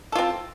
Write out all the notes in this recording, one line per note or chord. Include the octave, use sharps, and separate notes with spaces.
C4 F4 A4